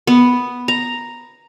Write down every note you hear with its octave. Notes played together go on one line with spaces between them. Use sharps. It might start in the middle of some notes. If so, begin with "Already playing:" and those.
B3
A#5